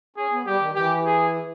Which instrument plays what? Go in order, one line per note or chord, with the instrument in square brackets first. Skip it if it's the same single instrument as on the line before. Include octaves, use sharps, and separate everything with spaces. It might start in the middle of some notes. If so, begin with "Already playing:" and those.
[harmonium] C#4 [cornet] G#4
[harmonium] B3
[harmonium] G3 [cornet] G4
[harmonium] D#3
[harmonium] E3 [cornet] G4
[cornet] G#4